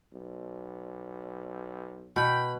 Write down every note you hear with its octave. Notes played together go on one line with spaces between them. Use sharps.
B1
B2 G5 B5